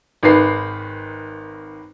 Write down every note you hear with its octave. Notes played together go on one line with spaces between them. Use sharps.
G#1 D#3 B4 C7